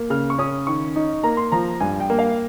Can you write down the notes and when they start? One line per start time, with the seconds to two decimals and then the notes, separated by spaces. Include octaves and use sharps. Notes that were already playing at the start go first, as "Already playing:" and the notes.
Already playing: A#3
0.10 C#3 F6
0.30 C#6
0.38 C#4 D#6
0.67 D#3 C#6
0.96 D#4
1.23 A#3 A#5
1.37 C6
1.52 F3 A#5
1.80 G2 G#5
2.00 G5
2.10 A#3
2.19 F5